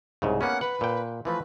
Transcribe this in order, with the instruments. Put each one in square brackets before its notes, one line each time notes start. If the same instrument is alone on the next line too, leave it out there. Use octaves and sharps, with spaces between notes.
[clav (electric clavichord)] C2 G#2 C#3
[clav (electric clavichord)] A#3 B3 C#4 [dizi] F#5
[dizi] B4 [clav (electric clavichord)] F#5
[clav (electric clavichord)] A#2 G5
[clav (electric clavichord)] E3 F3 A3 [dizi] B4